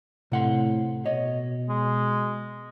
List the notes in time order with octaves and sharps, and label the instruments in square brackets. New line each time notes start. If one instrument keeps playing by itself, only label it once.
[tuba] A2 [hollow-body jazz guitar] C3 F#5 C6
[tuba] B2 [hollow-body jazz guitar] C#5 D#5
[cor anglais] G#3